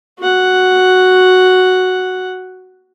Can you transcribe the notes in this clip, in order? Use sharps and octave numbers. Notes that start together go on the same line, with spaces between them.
F#4 F#5